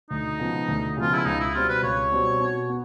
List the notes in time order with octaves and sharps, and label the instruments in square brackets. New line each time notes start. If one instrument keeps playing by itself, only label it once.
[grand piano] D2 [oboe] D#4
[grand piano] C#3 F3 G#3 B3
D2
[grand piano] C#3 F3 G#3 B3 [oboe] F4
[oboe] E4
[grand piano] C#2 [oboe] D#4
[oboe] E4
[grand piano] B2 G3 C4 [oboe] F4
[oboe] B4
[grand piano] C#2 [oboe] C#5
[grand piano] B2 G3 C4
B2
B3